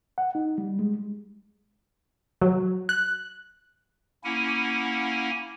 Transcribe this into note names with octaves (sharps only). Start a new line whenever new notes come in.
F#5
D#4
G3
G#3
F#3
F#6
A#3 C#4 E4 F#5 G#5